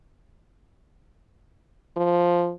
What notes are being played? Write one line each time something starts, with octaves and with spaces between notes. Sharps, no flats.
F3